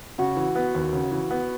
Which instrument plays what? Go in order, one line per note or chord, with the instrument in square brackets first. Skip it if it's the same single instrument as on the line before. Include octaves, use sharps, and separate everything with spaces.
[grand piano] C#3 [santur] F#4
[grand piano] E3
B3
D#2
C#3
E3
B3